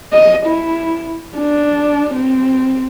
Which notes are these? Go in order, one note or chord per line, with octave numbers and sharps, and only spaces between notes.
D#5
E4
D4
C4